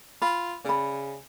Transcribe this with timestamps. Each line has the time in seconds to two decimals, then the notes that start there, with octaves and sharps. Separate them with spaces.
0.22 F4 B5
0.65 C#3 D5 B5